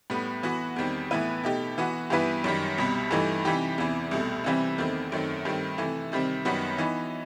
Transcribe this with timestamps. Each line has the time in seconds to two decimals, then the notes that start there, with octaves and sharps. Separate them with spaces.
0.10 A2 G3 B3
0.43 E3 B3 F#4
0.76 E2 D#3 G3 C4
1.11 A2 E3 B3 E4 B4
1.44 B2 A3 D#4 G4
1.78 E3 B3 F#4
2.10 G2 E3 B3 E4 B4
2.44 F#2 D#3 G3
2.78 C2 B2 G3
3.11 G2 E3 A3 D#4
3.45 C3 E3 G3 D#4 G4
3.78 E2 C3 E3
4.11 C2 B2 A3
4.44 C3 E3 G3 C4 E4
4.78 E2 D#3 A3 C4
5.12 F#2 D#3 A3 C4
5.45 G2 D#3 A3 C4
5.78 C3 E3 A3
6.12 C3 D#3 G3 C4
6.45 F#2 D#3 G3 B3 F#4
6.78 E3 B3 D#4